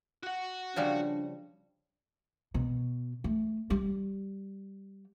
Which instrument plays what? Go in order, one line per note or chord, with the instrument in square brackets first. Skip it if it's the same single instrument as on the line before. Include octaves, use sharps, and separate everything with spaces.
[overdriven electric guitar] F#4 F#5
[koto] C#3 F3 G3 [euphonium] D4
[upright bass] B2
A3
G3